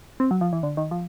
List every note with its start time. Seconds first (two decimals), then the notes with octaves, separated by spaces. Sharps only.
0.20 C4
0.31 F#3
0.41 F3
0.53 E3
0.63 D3
0.77 D#3
0.91 F3